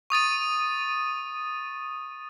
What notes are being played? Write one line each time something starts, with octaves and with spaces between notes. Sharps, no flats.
C#6 D#6 A6 D#7